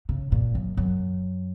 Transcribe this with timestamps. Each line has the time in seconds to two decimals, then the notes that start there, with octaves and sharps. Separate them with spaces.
0.09 C#3
0.32 A#2
0.55 F#2
0.77 F#2